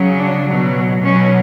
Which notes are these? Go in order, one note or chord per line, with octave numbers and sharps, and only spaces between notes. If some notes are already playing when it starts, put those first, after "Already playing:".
Already playing: C#3 F#3
D4
B2 F#3
B2 F#3 C#4